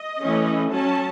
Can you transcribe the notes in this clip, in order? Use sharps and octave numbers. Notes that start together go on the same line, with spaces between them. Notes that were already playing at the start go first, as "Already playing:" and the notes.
Already playing: D#5
E3 A3 C#4
F#3 C#4 A5